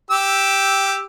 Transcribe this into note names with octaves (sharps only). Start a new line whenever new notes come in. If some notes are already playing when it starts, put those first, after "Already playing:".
G4 E6